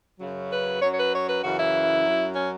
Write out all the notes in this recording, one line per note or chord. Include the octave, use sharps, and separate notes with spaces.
F#2 C#3 F#3
B4
F#2 F#3 C#5
C#5
B4
C#5
B4
F#2 C#3 E3 F#4
E4
F#2 F#3
C#4